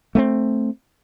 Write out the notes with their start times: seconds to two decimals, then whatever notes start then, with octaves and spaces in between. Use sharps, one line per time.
0.15 A3 A#3 C4